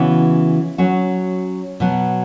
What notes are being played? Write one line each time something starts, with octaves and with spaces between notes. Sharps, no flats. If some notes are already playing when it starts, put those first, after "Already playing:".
Already playing: C#3 E3 B3 F#4
F#3 C#4 F#4
B2 F#3 B3